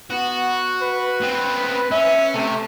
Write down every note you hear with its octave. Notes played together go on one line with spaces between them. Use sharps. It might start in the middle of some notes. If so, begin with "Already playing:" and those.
B3 F#4
B4
B3 C4
C#4 E5
C3 A3